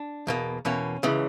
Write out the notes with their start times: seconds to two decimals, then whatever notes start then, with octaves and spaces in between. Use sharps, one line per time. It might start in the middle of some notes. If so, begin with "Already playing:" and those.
Already playing: D4
0.27 E2 B2 A#3
0.65 E2 B2 A#3 C#4
1.03 C#2 C#3 E3